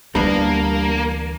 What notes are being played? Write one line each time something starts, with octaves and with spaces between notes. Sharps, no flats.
D2 E3 G3 A#3 B3 D4